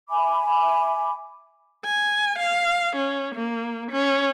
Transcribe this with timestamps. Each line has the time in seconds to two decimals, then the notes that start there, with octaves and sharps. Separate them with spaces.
0.10 E5 G#5 B5 D6
1.85 G#5
2.39 F5
2.96 C#4
3.35 A#3
3.92 C#4